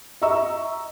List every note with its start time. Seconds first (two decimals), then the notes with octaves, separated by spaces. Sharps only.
0.22 D#5 E5 A#5 C#6 E6